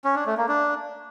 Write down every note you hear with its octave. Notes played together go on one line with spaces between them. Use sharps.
C#4
D4
A3
A#3
D4